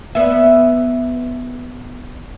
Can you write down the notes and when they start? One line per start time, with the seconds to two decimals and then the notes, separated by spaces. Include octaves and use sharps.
0.15 B3 E5